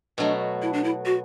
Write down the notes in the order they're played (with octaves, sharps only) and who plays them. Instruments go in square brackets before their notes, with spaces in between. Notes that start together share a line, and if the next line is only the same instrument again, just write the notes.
[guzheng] B2 F#3 A3 [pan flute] D4
[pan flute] E4
D4
E4
F#4